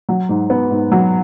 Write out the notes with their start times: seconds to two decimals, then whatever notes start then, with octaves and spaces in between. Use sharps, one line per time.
0.09 F#3
0.29 G#2
0.50 B3
0.71 G#2
0.92 F#3